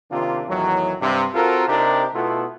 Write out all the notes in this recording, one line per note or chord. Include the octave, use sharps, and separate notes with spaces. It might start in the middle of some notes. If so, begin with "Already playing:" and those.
C3 D#3 A#3 C4 D4 F4
E2 A2 D#3 F#3
G2 C3
C4 F4 F#4 A4 A#4
C3 D4 D#4 G4 A#4
B2 A3 B3 E4 F4 A4